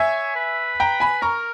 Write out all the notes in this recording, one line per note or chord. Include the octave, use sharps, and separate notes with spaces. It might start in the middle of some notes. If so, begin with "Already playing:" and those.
Already playing: C#5 E5 G#5
B4
G5 A#5
G#5 B5
A#4 A#5 C#6